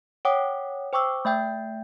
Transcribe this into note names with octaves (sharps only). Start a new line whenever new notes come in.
C#5 F#5 G5 D6 D#6
C5 G5 C#6 D6 E6
A3 E5 G5 G6